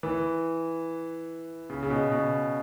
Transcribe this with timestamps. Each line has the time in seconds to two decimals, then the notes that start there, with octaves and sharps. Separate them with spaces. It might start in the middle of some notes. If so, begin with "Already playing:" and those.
0.03 E3
1.70 C#3
1.83 C#3
1.90 B2
2.12 B2